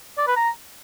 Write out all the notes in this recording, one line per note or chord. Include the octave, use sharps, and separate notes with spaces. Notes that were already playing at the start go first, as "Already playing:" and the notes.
D5
B4
A#5